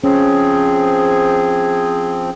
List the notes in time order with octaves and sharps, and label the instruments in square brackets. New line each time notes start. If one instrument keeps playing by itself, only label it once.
[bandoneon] F3 C4 [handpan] C#4 [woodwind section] G#4